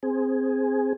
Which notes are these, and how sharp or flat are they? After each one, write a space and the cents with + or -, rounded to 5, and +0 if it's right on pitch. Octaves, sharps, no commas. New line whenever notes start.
C4 +0 G#4 +0